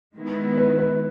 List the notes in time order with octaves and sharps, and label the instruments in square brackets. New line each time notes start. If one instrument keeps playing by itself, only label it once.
[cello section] D#3 G#3 B3 E4
[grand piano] B4
B4